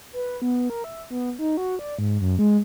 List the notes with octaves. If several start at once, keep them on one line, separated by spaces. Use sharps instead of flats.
B4
B3
A#4
E5
B3
D#4
F#4
D5
G#2
F#2
G#3